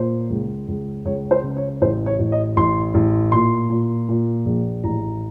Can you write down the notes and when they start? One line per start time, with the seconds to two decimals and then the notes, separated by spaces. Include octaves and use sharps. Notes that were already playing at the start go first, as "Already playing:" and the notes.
Already playing: A#2 C5
0.30 C#2
0.68 C#2
1.05 C#2 C#5
1.31 C5
1.44 C#3
1.57 C#5
1.81 A1 C5
2.06 C#5
2.19 A1
2.32 D#5
2.57 A1 C6
2.94 A1
3.32 A#2 C6
3.70 A#2
4.09 A#2
4.45 A#1
4.84 A1 A#5